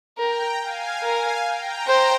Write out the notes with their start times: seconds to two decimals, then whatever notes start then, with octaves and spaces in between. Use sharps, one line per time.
0.17 A#4 G5 A#5
0.59 F5 G#5
1.02 A#4 F5 G#5
1.45 G5 A#5
1.87 C5